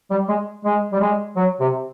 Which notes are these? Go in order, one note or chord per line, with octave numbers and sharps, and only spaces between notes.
G3
G#3
G#3
G3
G#3
F#3
C3